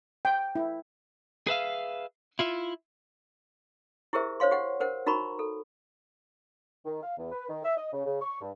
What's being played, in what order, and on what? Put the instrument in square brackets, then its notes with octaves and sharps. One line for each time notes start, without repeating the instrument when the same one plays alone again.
[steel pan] G5
E4
[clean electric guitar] G#4 B4 E5 F5
E4 F4 E5
[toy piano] E4 G4 G#4 A#4 C5 E5
C5 C#5 F5 C6
G4 F#5
A#4 C5 F#5
D#4 F#4 A#4 A#5 B5 C#6
A4
[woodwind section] D#3
F5
E2
B4
D#3
E5
D#5
C#3
C#3
C#6
G2